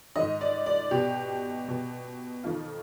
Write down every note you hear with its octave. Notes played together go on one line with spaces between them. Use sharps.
G#2 D#3 D#5
D5
D5
B2 G4
B2
F2 D#3 F4